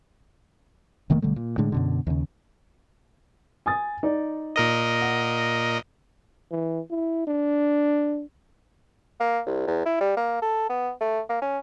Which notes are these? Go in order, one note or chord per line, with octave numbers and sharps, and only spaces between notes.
F1 D#3 A3 A#3
B1 D3 G3 A3
A#2
A2 D3 G#3
F#2 B2 D3
D#2 C#3
G#5 D#6 A6
D#4 D5
A#2 A#4 D#5
F#5
E3
E4
D4
A#3
C2
E2
E4
G3
A#3
A4
B3
A3
A#3
C#4